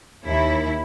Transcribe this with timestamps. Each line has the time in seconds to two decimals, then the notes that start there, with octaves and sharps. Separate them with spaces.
0.24 D#2 E4